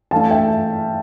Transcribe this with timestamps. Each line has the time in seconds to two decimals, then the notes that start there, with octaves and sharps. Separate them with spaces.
0.11 E3 A3 D4 F5 A5
0.31 E5 G5